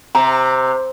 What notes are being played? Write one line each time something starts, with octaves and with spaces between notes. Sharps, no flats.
C3 A#5